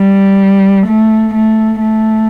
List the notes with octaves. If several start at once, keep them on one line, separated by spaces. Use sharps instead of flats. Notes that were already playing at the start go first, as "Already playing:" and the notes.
Already playing: G3
A3
A3
A3